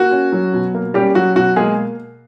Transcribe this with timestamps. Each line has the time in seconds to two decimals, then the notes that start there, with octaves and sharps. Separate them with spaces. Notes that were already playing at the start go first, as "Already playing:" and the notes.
Already playing: A#3 F#4
0.11 C#4
0.32 F#3
0.54 B2
0.74 A#3
0.94 G3 C#4 G4
1.15 F#3 F#4
1.36 B2 F#4
1.56 G#3 A#3 G#4